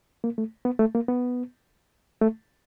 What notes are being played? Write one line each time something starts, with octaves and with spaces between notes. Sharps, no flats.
A#3
A3
B3
A3
A#3
B3
A3